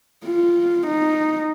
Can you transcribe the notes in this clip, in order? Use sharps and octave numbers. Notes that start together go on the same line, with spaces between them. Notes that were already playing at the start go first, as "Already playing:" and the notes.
F4
D#4